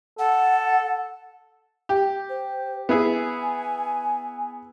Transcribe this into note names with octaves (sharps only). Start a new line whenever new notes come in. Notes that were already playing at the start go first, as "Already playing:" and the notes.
A4 F#5
G4
C5
B3 E4 G#4 G#5